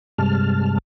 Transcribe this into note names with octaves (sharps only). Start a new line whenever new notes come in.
G2 C3 G3 G#3 A5 F6